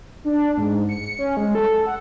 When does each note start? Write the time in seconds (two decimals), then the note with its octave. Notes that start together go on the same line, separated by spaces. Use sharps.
0.25 D4
0.57 G#2
0.89 C#7
1.19 C#4
1.37 G#3
1.55 A4
1.86 F#5